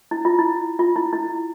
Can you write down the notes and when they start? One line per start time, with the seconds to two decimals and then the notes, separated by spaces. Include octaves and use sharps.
0.11 E4
0.25 F4
0.39 E4
0.79 F4
0.96 E4
1.13 E4